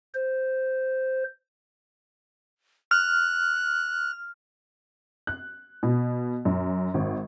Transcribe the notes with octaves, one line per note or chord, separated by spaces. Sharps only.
C5
F6 F#6
F#6
B2
F#2
G#1